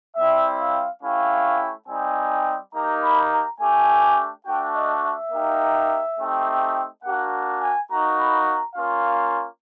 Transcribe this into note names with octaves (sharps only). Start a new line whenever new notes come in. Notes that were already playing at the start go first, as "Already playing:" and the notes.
G3 C4 E4 E5
F5
A3 C#4 E4 G4 F5
G3 C4 D#4 G4 G#5
A#3 D#4 G4 A#5
B5
A#5
A3 D4 G4 G#5
A3 D4 F#4 G5
D#5
E5
A#3 D#4 G4
A3 C4 D#4 G4
A#3 D4 F#4 F#5
G#5
A#3 D#4 F#4 A#5
B5
A#5
A#3 C#4 F4 F5